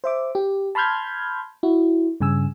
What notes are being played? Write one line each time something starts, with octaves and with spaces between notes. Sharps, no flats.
C5 E5 D6
G4
A5 B5 C6 F6 G6 G#6
E4 F#4
G2 C#3 G#5 E6